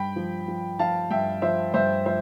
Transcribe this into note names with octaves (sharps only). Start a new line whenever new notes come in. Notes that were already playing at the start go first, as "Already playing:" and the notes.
Already playing: G2 G5 B5
F3
F3
F3 F5 A5
G2 E5 G5
F3 C5 E5
G2 C5 E5
F3 C5 E5